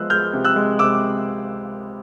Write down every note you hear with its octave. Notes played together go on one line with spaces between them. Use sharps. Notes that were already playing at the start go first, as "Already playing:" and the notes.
Already playing: F3 G#3 B3 E6 F#6
G#3 F6 G6
C3
E6 F#6
G#3
C3 D6 E6